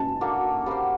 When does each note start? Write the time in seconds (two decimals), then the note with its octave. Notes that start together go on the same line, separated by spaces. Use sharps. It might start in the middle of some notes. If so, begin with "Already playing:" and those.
Already playing: A5
0.21 A#3 D4 F#4 A4
0.66 G3 A#3 F#4 C5